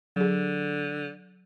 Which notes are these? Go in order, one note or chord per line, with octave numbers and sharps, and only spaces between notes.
D3 F#3 G#4